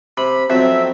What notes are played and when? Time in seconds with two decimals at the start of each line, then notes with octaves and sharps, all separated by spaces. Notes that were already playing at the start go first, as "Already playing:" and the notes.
0.17 C3 B5
0.50 F2 F#3 C4 E5